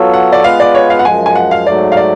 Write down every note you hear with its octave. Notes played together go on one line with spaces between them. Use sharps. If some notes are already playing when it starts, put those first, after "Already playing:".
Already playing: F#3 B3 F4 A4 C#5
F#5
D5
G#3 B3 F4 B4 F5
D5
C#5
F5
F#5
F#2 F3 G#3 G#5
G#5
F#5
F5
G#2 F#3 A3 D5
F5
D5